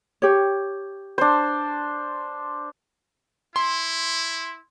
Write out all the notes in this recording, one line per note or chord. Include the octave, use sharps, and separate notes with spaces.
G4 C#5
D4 C5
E4 C6